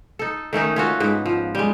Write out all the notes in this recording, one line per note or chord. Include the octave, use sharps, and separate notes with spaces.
D#4 A4
D#3 A3 C#4 D#4
C#4 F4 F#4 A4
G#2 B3
F3
G3 G#3